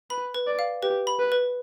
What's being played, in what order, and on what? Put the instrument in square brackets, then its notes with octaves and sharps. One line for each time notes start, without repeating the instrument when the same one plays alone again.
[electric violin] B4 [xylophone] B5
[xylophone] B4
[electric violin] D5
[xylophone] F5
[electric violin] G4 [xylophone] B4
[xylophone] B5
[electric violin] B4
[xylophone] B4